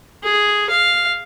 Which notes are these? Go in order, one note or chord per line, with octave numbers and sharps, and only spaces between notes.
G#4
F5